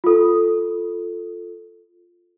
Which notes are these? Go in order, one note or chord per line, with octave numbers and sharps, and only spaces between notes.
F4 A4